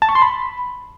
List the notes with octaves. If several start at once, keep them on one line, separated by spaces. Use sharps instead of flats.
A5
C#6
C6
B5